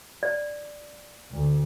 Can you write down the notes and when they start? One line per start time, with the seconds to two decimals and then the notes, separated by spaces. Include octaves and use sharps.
0.23 D5
1.33 D2